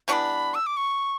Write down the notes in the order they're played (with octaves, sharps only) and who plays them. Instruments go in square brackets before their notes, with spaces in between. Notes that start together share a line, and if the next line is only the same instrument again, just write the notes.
[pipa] E3 G3 B3 D4 [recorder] B5 C#6
[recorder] E6
D6
C#6